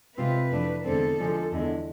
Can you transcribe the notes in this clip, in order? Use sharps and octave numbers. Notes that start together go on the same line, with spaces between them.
C3 G#3 C4 F4 B4
F2 E3 A3 D4
E2 D3 G#3 C4 A4
D3 F3 G#3
E2 D3 G#3